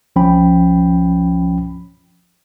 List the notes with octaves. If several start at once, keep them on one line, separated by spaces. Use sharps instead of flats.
C2 F3 C#4 G5 B5